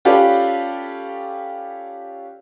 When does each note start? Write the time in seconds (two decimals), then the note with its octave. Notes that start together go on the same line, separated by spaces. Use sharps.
0.05 C#4 F4 G4 A4 B4 D5